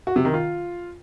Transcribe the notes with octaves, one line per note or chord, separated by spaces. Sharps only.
F#4
C3
D#3
F4